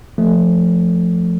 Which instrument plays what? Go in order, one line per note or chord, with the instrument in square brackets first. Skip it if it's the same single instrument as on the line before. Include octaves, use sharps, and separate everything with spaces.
[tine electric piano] F3 A3